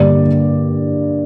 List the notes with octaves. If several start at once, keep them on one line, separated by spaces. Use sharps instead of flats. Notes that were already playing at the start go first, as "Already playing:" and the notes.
Already playing: G2 D3 G3 A#3 D5